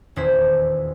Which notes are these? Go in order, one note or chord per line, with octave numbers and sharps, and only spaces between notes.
D#1 E2 E4 G#4 C5 B6